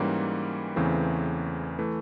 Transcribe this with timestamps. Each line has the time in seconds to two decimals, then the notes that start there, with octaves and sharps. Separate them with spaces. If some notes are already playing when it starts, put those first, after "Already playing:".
Already playing: G#2 E3 G3 A#3 C#4
0.76 E2 C#3 E3 A3 C4
1.79 E3 A3